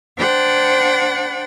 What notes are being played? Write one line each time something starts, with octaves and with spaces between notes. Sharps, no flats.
D4 C5 F#5 G5 A6